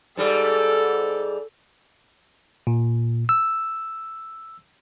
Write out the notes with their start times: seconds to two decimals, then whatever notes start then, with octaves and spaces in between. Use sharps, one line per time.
0.17 G#2 G3 A4
2.67 A#2
3.29 E6